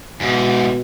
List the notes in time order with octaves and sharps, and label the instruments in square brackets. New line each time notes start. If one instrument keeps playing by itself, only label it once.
[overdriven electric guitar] E2 G#2 [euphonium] B2